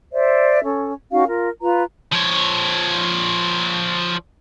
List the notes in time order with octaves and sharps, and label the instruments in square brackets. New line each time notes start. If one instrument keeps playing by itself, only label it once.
[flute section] C5 D5 E5
C#4 A4
C#4 D#4 F#4 F5
F4 A#4
F4 B4 A#5
[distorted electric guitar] F3 C#5